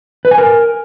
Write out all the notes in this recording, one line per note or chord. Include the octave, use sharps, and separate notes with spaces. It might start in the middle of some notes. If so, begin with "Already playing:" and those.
B4
G#5
A#4